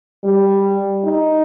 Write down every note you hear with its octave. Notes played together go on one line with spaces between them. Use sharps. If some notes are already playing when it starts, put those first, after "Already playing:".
G3
D#4